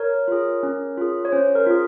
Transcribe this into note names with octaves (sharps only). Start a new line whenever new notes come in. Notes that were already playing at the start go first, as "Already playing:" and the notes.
Already playing: A#4 C#5
F4 G#4
C#4
F4 G#4
C#5
C#4 C5
A#4
F4 G#4